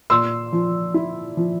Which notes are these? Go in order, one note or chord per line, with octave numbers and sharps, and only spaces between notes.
A#2 C6 E6
F3
E4
F3